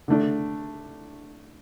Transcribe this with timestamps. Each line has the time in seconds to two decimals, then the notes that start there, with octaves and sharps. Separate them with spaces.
0.08 D3 A3 D4